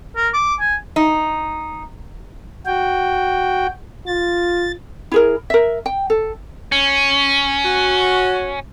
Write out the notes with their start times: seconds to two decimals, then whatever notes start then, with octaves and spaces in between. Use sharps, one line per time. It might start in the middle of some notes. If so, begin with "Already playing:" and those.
0.16 A#4
0.34 D6
0.60 G#5
0.96 D#4
2.66 F#4 G5
4.07 F4 A6
5.12 E4 G#4 A#4
5.50 A#4 E5
5.86 G5
6.10 A4
6.72 C#4
7.64 F#4